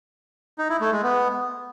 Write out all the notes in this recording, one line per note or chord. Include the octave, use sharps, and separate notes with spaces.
D#4
E4
A3
G#3
B3